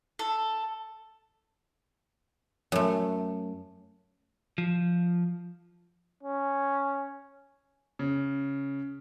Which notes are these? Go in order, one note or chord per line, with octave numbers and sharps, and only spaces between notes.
A4
F#2 A3
F3
C#4
C#3